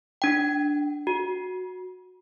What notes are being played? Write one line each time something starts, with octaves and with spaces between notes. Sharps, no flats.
D4 G5
F#4